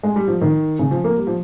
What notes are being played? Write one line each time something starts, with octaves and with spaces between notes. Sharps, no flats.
G#3
G3
F3
D#3
C#3
F3
A#3
G3
F3